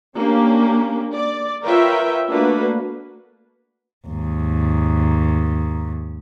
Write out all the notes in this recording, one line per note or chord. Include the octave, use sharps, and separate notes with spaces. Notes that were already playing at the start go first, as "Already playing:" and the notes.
A#3 C#4 D4 G4
D5
F4 A#4 B4 C#5 E5 G5
A3 A#3 D4 F#4 B4
D#2 G#2